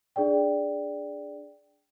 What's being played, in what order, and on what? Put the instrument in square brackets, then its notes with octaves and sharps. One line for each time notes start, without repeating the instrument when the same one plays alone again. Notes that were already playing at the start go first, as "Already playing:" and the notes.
[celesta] D4 G#4 D5 G5